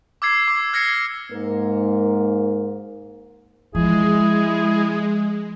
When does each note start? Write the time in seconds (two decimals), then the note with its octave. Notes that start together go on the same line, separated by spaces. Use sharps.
0.22 D6 E6 G#6 C7
0.48 D6
0.73 F6 G#6 A#6 C7 C#7
1.32 G#2 A#3 A#4
3.75 F3 G#3 E4 G#4